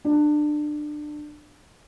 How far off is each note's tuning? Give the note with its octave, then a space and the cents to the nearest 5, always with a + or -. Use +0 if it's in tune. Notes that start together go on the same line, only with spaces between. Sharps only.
D4 +25